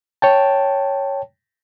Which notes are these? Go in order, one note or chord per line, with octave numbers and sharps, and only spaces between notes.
C#5 G5 A5